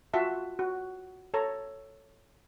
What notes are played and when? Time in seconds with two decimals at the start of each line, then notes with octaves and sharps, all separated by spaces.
0.13 F4 F#4 E5 A5
0.59 F#4
1.34 A4 C#5 A#5